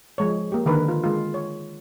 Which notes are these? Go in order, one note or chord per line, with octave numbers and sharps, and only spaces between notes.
F3 G#3 C#5
A#3 G4
D3 D#3 A#4 B4
F4 A#4
G#3 F4
C#5